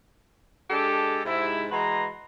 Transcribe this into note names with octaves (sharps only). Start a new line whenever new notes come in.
G#3 D4 G4 A4
G#2 C3 E4
E3 G#3 F#4 B4 A#5 C6